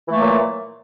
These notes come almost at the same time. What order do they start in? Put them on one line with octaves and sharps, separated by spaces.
E3 A3 A#3 F#3 A#2